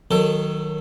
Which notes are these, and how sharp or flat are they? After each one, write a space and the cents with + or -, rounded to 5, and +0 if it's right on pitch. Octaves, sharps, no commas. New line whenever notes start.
D#3 +0 F#3 +0 A4 +25